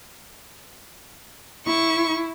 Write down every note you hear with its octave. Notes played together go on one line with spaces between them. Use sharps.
E4 C#6